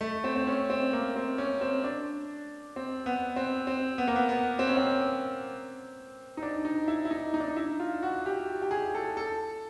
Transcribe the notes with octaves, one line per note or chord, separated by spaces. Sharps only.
A3
C4
C4
C#4
C4
A#3
C4
C#4
C4
D4
C4
B3
C4
C4
B3
A#3
B3
B3
C4
C#4
C4
D#4
D4
D#4
E4
E4
D#4
D#4
D4
D#4
E4
F4
F#4
G4
G4
G#4
A4
A4